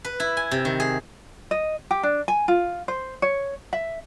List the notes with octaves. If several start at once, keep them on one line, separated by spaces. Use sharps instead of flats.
B4
E4
G#5
C3
D#3
G#4
D#5
G4
D4
G#5
F4
C5
C#5
E5